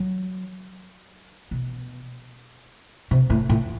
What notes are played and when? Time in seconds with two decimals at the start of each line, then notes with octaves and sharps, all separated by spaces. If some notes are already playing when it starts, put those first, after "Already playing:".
Already playing: F#3
1.51 B2
3.11 C3
3.30 A2
3.50 A2